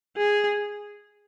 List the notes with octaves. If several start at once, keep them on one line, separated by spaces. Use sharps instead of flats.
G#4